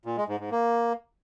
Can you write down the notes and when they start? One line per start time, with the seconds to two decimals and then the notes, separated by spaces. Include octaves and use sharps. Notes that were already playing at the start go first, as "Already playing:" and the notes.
0.05 A#2
0.17 G#3
0.28 G#2
0.40 G#2
0.51 A#3